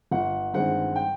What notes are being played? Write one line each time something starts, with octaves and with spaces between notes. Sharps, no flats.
G1 F#5
G2 D#3 G#3 C4 F#5
G5